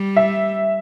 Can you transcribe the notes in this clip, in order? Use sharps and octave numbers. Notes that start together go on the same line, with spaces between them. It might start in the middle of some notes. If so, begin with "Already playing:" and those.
Already playing: G3
E5